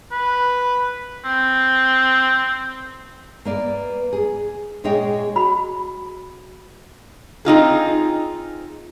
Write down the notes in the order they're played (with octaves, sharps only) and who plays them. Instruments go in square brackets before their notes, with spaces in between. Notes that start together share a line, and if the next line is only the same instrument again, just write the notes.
[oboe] B4
C4
[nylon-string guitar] A#3 B4 D5
G#4
A#2 G#3 G#4 C#5 D#5 G5
[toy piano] F#4 B5
[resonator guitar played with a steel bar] C4 D#4 F4 G#4